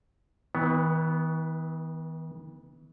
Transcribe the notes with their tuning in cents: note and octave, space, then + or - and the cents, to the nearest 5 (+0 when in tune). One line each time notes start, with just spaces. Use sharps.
E3 -45 B3 +0